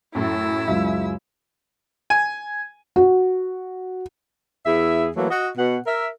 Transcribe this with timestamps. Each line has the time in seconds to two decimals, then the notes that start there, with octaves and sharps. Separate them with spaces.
0.15 F#2 A2 E4 E6
0.68 C#2 F#2 G#3 E5
2.10 G#5
2.96 F#4
4.66 E2 E4 G#4 E5
5.17 E3 F#3 A3 A#3
5.31 F#4 D#5
5.58 B2 F#5
5.87 A#4 E5